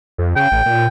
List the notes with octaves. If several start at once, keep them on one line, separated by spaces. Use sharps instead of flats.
F2
C#3 G5
A1
A#2